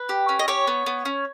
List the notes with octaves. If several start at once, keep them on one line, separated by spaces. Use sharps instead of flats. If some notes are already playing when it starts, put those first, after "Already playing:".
Already playing: B4
G4
C#4
D#5
G4 C#5
B3
B3
C#4